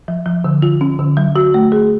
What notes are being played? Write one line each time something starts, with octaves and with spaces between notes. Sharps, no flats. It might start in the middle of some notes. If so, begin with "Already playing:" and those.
F3
F3
D3
F4
C#4
D3
F#3
F#4
A3
G#4